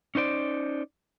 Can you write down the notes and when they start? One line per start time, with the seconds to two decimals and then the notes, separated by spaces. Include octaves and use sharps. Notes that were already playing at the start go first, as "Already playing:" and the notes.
0.15 C#4 D#4 C5 D5